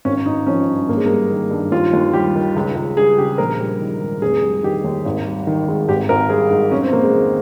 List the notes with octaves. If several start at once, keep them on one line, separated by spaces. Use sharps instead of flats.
G#1 C#4
G#1 D#4
F3 C#4
G2
G#1 A#3
G#3
G3 A#3
D#3
G2
D#2 F4
D#2
G3 G4
D#3
C#2
C#2
G3 G#4
C#3 G4
A#1 A#4
G3
D#3
G#2
F1 G#4
G3
D#3 G4
D#2
G#1
G3
D#3
G#2
G#1 G4
G#1 A#4
G3 G#4
G#2
F1 C#4
C4
F1 A#3
G#3
D#3